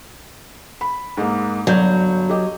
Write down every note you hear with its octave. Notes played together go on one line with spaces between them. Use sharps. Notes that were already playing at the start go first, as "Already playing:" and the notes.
B5
G#2 G#3 A#3
G1 F#3 D5 G6
G4 D#5